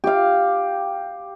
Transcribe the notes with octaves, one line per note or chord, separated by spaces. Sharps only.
G4 F5